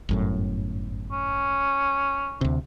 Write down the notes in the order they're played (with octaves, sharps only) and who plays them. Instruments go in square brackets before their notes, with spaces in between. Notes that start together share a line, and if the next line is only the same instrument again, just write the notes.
[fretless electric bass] G1 F#2 A2
[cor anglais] C#4
[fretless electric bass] D2 C3